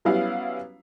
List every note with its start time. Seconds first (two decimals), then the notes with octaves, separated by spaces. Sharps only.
0.05 F#3 G3 B3 C#4 E4 F5